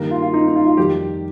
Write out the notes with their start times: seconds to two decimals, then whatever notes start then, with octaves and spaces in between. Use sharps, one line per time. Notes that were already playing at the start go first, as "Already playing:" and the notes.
Already playing: G2 D#3 G3 A#3 A#4
0.11 F4
0.22 F4
0.34 D#4
0.48 D#4
0.56 F4
0.67 F4
0.77 F2 D#3 G3 G4